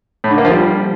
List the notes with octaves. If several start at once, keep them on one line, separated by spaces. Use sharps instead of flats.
A2
D3
A#3
F3
G3